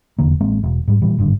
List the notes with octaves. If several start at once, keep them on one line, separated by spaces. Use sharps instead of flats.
F1 E2 D3 A#3
A1 G#3 A#3 C4
E1
G#2 G3
A#2 E3 G3
G#1 G2 D3